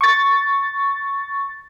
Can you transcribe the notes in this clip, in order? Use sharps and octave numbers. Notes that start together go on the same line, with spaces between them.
C#6 A6